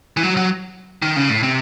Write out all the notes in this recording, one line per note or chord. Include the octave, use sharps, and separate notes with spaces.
E3
F#3
F#3
D#3
C#3
A2
C3